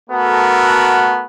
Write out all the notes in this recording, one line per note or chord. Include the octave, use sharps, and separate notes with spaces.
A3 B3 F#4 A4 A#4